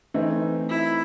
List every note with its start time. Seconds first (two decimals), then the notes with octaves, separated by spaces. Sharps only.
0.14 E3 A3 C4 D#4
0.69 E4